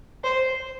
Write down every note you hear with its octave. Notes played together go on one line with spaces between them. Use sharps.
C5